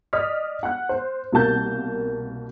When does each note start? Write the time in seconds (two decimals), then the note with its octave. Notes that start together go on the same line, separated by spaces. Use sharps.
0.13 D5 D#5 D#6 F6 B6
0.63 F#5 F#6
0.89 C5
1.32 C2 B2 A#3 A5 G6